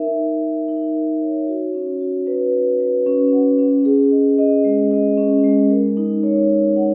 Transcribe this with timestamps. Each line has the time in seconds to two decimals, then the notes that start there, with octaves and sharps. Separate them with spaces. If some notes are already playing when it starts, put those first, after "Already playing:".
Already playing: D#4 A#4 E5
0.16 E5
0.43 A#4
0.68 D#4
0.95 A#4
1.21 C#5
1.48 F#4
1.74 C#4
2.01 F#4
2.27 B4
2.53 B4
2.80 B4
3.06 C#4
3.33 F#5
3.59 C#4
3.85 G#4
4.11 D#5
4.38 D#5
4.64 G#3
4.91 D#5
5.17 C#4
5.44 G#3
5.70 A#4
5.97 D#4
6.23 C#5
6.50 A#4
6.76 F#5